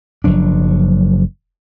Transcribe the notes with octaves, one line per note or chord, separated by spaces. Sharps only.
F#1 F3 F#3 D4